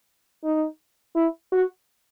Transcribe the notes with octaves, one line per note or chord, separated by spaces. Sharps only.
D#4
E4
F#4